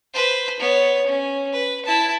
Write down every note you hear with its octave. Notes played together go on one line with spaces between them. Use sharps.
B4 C5
B3 C#5
C#4
B4
E4 A5